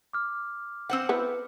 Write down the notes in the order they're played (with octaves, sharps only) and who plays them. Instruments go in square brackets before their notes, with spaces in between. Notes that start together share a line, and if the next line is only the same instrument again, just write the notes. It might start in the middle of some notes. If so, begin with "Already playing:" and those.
[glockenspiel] D6 F6
[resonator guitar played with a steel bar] C4 C5 F#5
[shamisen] B3 E4